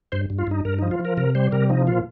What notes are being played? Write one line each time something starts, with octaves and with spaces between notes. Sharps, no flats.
G2 C5
G2
F4
G2 D#4
G2 A#4
F3 D#4
F4
F3
A#4
C3 A#4
G3 C5
C3 A#4
F3 D#4
A#2 F4